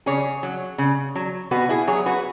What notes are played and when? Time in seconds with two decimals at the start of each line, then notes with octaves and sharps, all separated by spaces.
0.06 C#3 G#4 C#5
0.43 F#3
0.78 C#3
1.15 F#3
1.51 B2 F#4 B4
1.69 E4 G#4
1.87 F#3 G#4 C#5
2.06 F#4 B4